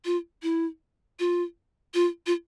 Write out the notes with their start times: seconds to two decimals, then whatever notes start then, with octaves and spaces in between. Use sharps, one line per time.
0.05 F4
0.43 E4
1.19 F4
1.94 F4
2.26 F4